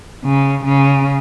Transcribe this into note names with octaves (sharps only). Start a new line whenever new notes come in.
C#3
C#3